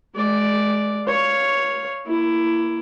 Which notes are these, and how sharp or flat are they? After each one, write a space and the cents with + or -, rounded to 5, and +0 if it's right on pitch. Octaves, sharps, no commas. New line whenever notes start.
G#3 +30 D5 +0
C#5 +0 F5 +0
A#3 +0 E4 +15